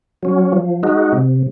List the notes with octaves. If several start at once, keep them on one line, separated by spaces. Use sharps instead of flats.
F#3 C#4
F3
G#3 D#4 F#4
C3